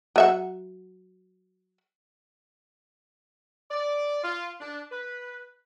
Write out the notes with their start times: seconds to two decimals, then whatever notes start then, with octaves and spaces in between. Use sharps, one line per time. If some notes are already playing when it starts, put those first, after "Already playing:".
0.16 F#3 E5 F#5
3.71 D5
4.24 F4
4.61 D4
4.92 B4